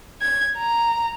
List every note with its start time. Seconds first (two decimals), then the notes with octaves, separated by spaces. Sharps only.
0.22 G#6
0.58 A#5